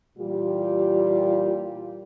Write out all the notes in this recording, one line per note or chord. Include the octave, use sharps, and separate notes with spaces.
A#2 E3 G3 F4 G4